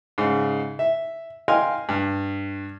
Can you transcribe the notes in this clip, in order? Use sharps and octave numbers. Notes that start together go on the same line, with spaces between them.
G#2 C#3
E5
D#5 F5 G5 G#5 C6 F6
G2